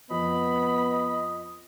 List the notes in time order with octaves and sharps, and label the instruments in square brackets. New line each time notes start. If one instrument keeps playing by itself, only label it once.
[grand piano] F2 [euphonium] B3 [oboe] D#5 [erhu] B5